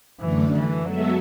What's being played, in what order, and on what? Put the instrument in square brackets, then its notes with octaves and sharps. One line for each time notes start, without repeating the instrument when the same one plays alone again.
[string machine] F#2 D3 A3 D4 [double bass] E3
[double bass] E3
[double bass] F#3 [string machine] G#3 B3 F#4 A4 E5